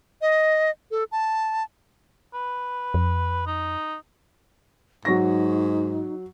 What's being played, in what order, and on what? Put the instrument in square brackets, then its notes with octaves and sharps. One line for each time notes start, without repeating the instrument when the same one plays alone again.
[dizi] D#5
A4
A5
[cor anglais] B4
[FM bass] F2
[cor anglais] D#4
[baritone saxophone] G#2 [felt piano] F#3 C#6 A#6 [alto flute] D#4